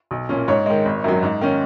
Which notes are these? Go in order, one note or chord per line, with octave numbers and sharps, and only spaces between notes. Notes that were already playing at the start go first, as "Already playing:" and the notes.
B1
A#2 A#3 C#4
G#2 C#5
D#3 G#3
G#1
F#2 D#3 F#3
G#2
D#3 A#3 C#4